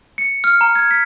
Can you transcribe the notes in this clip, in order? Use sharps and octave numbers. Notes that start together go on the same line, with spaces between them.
C#7
F6
A#5
G#6
B6